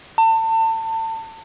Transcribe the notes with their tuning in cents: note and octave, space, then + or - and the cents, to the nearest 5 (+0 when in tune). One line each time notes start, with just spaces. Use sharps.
A5 +30